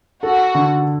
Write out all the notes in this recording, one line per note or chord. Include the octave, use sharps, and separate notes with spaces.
F#4 A4
D3